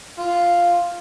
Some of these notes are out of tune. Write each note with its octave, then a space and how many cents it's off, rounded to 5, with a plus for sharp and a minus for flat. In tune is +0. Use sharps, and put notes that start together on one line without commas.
F4 +0